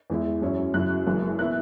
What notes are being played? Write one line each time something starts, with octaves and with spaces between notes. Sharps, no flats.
E2 E3 G#3 E4
F#2 F#3 C#4 E4
F#2 C#3 F#3 E4 F#6
F#1 F#2 E3 G#3
B2 B3 E4 F#6